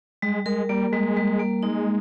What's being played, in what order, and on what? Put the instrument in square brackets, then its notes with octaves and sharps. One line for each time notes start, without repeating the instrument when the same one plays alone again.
[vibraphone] G3 [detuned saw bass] G#3
[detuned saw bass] G#3 [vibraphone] A#4
[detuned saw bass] G3 [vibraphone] A#3
[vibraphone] G3 [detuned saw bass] G#3
[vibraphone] G3
A#3
[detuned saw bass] G#3 [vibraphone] D#4